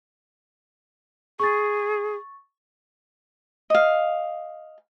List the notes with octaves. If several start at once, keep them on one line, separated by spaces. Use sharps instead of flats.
G#4 C#6 A6
D#5 F5